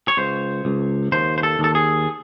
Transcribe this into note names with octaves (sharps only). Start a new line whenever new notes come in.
C#5
C#2 C5
C#2
D#2 C5
C5
A4
D#2 A4
G#4